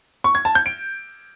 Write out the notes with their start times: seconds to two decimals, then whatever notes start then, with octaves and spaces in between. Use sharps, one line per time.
0.24 C#6
0.35 G#6
0.45 A5
0.55 G6
0.66 D7